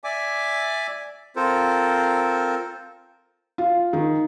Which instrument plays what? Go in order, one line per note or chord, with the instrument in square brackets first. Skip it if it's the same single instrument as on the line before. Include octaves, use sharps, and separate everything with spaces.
[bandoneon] D5 E5 G#5 D6
C4 F4 A4 A#4 C5
[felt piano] F4
D#3